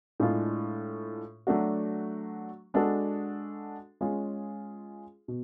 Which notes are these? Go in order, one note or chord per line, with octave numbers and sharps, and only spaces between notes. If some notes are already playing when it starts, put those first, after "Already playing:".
A2 G#3 D4 F4
F#3 A3 D4 F#4
G#3 D4 F#4 A4
G#3 C#4 F4 G#4
B2